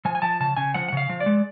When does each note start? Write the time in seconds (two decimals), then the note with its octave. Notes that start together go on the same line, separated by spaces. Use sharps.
0.05 F3 G#5
0.15 G#5
0.22 F3 A5
0.40 C#3 A5
0.57 C#3 G#5
0.74 F3 F#5
0.89 F#5
0.92 C#3 F5
1.09 F3
1.20 D5
1.26 G#3